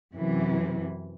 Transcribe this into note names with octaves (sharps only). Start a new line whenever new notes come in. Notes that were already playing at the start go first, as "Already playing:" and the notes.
F#2 C3 E3